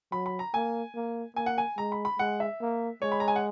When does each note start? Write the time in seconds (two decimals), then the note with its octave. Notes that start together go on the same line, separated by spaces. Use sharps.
0.12 F#3 B5
0.26 B5
0.39 A#5
0.54 A#3 G#5
0.95 A#3
1.36 A#3 G#5
1.46 F#5
1.58 G#5
1.78 G#3 A#5
1.92 B5
2.05 B5
2.19 G#3 F#5
2.40 E5
2.61 A#3
3.02 G#3 C#5
3.12 B5
3.20 A#5
3.28 G#5
3.36 F#5